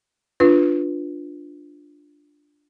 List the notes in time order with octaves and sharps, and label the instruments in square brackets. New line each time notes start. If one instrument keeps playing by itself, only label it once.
[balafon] D4 F4 B4